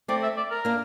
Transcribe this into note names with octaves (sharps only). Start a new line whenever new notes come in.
A3 C4 D5
E5
D5
A#4
A#3 D4